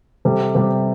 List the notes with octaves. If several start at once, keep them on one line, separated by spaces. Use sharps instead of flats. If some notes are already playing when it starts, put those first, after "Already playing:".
C3 G3 A4
C3 G3 G4